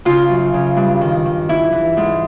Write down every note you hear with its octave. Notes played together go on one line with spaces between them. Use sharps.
C#3 F4
F#2
C#3
G2
D#3
D#3
E3 E4
E3
G#2